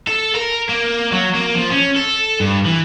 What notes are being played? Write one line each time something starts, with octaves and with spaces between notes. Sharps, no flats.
A4
A#4
A#3
F#3
A#3
F3
C#4
A4
G2
E3